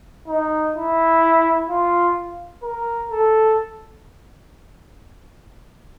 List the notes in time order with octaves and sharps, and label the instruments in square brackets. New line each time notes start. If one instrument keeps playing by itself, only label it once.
[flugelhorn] D#4
E4
F4
A#4
A4